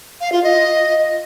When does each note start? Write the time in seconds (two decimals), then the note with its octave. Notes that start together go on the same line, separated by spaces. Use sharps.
0.21 F5
0.32 F4
0.43 D#5